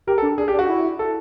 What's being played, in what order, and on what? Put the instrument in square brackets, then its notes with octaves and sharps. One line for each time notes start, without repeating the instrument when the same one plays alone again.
[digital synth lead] G4 [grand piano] A#4
[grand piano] A4
[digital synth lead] D4
[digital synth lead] D4 [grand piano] G#4
[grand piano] G4
[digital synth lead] D4
[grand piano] F#4
[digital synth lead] E4
[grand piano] A4